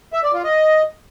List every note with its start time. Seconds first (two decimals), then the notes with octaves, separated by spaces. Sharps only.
0.13 E5
0.24 D5
0.34 F4
0.44 D#5